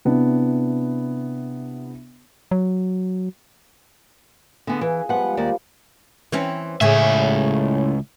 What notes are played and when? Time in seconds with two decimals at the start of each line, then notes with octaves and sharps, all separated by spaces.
0.05 C3 B3 D4 E4
2.51 F#3
4.67 D3 B3 G#4 F5 G#5
4.81 E3
5.09 F3 G3 G#3 B3 F#5
5.37 D#2 A#3 D5
6.32 E3 C4 C#4
6.81 C#2 A2 C#3 G#4 E5